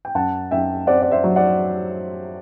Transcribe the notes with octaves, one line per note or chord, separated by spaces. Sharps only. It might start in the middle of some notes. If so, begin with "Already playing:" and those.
G5
F#2 F#5 A5
F#2 E5 G5
C4 D5 F#5
D5
C5 E5
F#3
D5 F#5